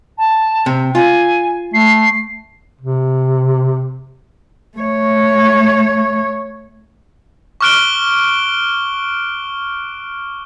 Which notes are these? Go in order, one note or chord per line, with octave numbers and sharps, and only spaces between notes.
A5
C3
F4 G#5
A3 C7
C3
A3 C#5
C#6 D6 F6 F#6 D7 G7